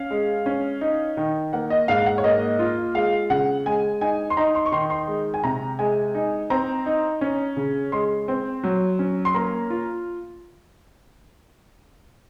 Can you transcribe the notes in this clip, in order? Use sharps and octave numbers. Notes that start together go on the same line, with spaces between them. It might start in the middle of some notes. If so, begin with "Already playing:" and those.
Already playing: C#4 F5
G#3
C#4
D#4
D#3
A#3 F#5
D#5
G#2 F5
F#5
C#5
A#3 D#5
F4
G#3 F5
C#3 F#5
G#3 G#5
D#4 G#5
C6
D#4 A#5
C6
C#6
D#3 C6
C6
G#3
G#5
C3 A#5
G#3 G#5
D#4
C4 A#5
D#4
C#4
C#3
G#3 C6
C4
F#3
C#4
C6
A#3 A#5
F4